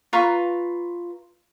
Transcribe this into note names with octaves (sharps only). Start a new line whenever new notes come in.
F4 B4 A#5 C#6